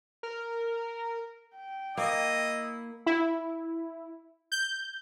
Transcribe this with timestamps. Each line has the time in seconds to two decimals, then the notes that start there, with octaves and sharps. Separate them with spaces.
0.23 A#4
1.56 G5
1.97 A#3 E4 D#5
3.06 E4
4.52 G6